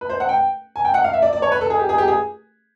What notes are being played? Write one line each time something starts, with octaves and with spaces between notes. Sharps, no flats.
B4
C5
F#5
G5
G#5
G5
F#5
F5
E5
D5
D5
C#5
B4
A4
G#4
G4
G#4
G4
G#4